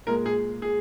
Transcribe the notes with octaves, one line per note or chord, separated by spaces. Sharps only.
A#2 G#3 A#4
G#4
G#4